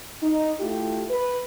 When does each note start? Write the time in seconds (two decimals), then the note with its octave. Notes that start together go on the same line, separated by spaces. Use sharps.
0.22 D#4
0.60 A3 E4 F4 G4
1.10 B4